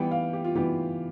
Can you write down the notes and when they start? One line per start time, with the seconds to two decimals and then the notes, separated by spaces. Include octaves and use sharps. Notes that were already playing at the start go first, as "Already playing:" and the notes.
Already playing: E3 G3 B3 G5
0.11 F5
0.33 G4
0.44 F4
0.55 E3 G3 B3 G4